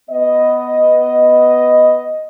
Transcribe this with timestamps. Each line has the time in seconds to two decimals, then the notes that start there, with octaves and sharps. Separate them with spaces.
0.10 B3 D#5